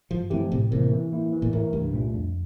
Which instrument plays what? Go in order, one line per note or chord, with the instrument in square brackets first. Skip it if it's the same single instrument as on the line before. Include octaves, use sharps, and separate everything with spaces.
[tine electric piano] G2 [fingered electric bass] F3
[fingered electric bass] E3 [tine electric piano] F3 A3 C4 G4
[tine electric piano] A2 [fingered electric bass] C3
[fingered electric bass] C3 [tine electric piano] E3 A#3 E4 A#4
[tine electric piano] E3
A#3 E4
E3
[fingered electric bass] A#2
[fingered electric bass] A2 [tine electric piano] A3 E4 A#4
[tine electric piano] C2 [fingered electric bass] G2
[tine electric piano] A#2 A3 D4 F4
F2